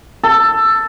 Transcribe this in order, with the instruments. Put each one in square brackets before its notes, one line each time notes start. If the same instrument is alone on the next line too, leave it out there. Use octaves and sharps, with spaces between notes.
[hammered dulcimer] A4